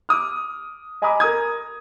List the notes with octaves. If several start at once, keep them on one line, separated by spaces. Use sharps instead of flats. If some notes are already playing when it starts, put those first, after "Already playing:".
D6 D#6 F6
D#5 G#5 A#5 B5 D6 D#6
A#4 A#5 D#6 G#6